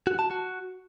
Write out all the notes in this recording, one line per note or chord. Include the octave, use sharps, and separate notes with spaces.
F#4
A5
F#4